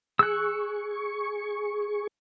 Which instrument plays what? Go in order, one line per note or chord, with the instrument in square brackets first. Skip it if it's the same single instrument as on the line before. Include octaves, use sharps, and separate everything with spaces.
[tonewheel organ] G#4 C#6 [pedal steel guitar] E6 F#6